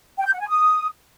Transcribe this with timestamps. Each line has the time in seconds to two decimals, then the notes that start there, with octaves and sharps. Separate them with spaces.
0.18 G5
0.25 G6
0.33 F#5
0.40 G#5
0.48 D#6